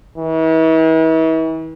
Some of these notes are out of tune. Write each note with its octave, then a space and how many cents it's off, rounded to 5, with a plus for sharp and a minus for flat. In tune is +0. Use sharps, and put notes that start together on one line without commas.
E3 -40